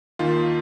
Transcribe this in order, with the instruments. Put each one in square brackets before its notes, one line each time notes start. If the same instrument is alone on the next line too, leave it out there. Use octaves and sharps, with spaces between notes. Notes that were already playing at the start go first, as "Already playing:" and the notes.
[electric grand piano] D#2 D#3 F4